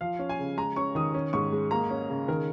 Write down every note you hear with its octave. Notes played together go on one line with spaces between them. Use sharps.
F3 F5
C#4
G#5
C#3
G#3 A#5
C#4 C#6
D#3 D#6
C#4
G#2 C#6
G#3
A#3 A#5
C#4
C#3
D#3 A#4